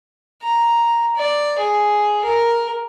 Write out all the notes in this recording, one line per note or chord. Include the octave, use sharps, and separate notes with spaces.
A#5
D5
G#4
A#4